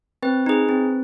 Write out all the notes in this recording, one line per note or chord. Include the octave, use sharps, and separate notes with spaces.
C4 B4
D#4 G#4
C4